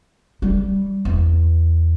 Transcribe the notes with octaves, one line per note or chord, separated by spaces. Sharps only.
G3
E2